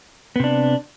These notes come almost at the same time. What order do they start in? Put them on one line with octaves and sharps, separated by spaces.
B3 C3 D4